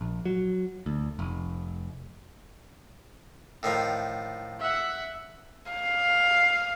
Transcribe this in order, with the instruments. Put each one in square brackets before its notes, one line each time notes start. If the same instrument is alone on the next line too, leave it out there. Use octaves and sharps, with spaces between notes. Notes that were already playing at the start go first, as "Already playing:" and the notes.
[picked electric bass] A#1
F#3
D2
F1
[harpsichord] A2 D#3 F3
[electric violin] E5 F#5
[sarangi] F5